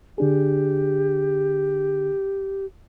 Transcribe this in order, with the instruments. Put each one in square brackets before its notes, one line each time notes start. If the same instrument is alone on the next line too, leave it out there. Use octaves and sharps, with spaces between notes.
[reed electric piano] D3 D4 G#4 [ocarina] G4